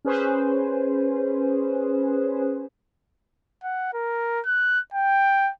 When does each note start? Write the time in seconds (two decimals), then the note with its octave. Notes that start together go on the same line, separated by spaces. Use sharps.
0.05 C#4 G#4 B4 C5
3.63 F#5
3.93 A#4
4.46 F#6
4.94 G5